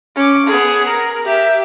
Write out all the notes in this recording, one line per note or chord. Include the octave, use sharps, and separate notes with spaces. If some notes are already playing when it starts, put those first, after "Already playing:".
C#4 D6
B3 G#4
A#4
G4 E5